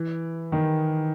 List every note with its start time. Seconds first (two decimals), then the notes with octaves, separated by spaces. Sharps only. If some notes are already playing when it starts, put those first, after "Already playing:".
Already playing: E3
0.52 D#3